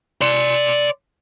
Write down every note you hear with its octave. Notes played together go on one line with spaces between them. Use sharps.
D5 C6